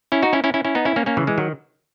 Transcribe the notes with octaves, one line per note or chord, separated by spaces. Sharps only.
C#4 E4
D#4 F#4
C#4 E4
C#4 E4
C#4 E4
C#4 E4
B3 D#4
C#4 E4
A#3 C#4
A#3 C#4
C#3 E3
E3 G#3
D#3 F#3